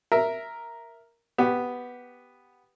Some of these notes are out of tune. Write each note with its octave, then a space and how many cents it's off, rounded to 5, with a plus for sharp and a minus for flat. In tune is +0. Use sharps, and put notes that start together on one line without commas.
A#4 +0 E5 +0
B3 +0 G4 +0